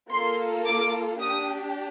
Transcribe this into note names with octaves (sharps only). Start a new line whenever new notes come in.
A#3 F4 A4 C6
D6
D4 G4 D#6